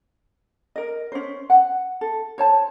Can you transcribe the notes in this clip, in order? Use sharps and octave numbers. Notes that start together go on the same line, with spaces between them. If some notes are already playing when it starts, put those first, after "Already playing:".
A#4 D#5
C#4 C5
F#5
A4
C5 C#5 A5